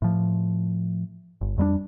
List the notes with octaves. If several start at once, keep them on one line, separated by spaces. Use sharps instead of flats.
A2 F3
G1
F2 G3 G#3 D4